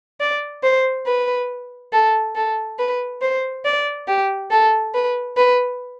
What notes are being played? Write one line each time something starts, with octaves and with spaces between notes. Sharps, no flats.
D5
C5
B4
A4
A4
B4
C5
D5
G4
A4
B4
B4